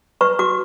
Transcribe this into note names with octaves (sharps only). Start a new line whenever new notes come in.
B4 C#6
F#4 D6